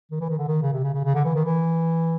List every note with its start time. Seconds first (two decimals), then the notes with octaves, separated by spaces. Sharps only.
0.11 D#3
0.21 E3
0.30 D#3
0.38 D3
0.48 D#3
0.62 C#3
0.73 C3
0.83 C#3
0.94 C#3
1.05 C#3
1.15 D3
1.25 E3
1.36 D#3
1.45 E3